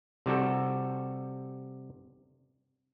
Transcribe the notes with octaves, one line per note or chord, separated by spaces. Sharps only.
C3 G3 F#4 A4